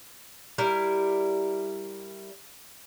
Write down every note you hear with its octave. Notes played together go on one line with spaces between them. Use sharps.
G3 E4 A#4